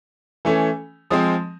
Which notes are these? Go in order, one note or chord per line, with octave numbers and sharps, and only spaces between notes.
E3 A3 C#4
F3 G#3 C4 D#6